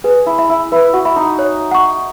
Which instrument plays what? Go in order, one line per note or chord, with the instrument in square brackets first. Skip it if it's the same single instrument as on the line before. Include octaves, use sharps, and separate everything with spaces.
[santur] G#4 [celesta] B4
[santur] E4
[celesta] E5 B5
[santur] E4
[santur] E4 [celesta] B4
[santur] F#4
[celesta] E5 B5
[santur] D#4
[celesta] C#5
F#5 C#6